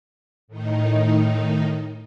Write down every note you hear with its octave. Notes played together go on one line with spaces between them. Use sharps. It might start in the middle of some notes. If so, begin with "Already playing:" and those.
A2 D#3 D#4